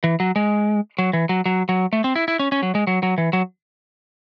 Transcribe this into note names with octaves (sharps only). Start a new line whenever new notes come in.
E3
F#3
G#3
F#3
E3
F#3
F#3
F#3
A3
C4
E4
E4
C#4
C#4
F#3
G#3
F#3
F#3
E3
F#3